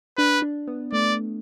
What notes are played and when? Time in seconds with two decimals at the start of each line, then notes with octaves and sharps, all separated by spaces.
0.18 D4 B4
0.42 D4
0.68 B3
0.93 A3 D5